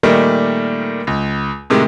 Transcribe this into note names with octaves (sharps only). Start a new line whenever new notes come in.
A#2 D#3 G3 A3 A#3
C#2
A2 C3 D#3 G#3